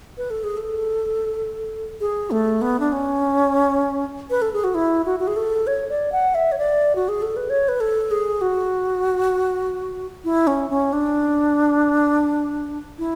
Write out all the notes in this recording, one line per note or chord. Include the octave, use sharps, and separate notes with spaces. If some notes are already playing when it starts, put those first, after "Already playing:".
B4
A4
G#4
A4
G#4
A3
B3
D4
C#4
B4
A4
G#4
F#4
E4
F#4
F#4
G#4
A4
C#5
D5
F#5
E5
C#5
D5
F#4
G#4
A4
B4
C#5
B4
A4
G#4
F#4
E4
C#4
C#4
D4
E4